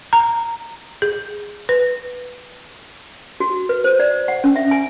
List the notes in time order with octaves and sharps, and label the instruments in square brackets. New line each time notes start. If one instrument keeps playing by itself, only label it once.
[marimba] A#5
G#4
B4
[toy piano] F#4
B4
C5
D5
F#5
C#4
E5
G#5